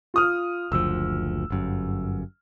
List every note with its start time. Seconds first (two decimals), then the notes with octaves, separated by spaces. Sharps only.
0.14 F4 D#6 F6
0.72 F#1 D2 F3 E6
1.50 G1 F#2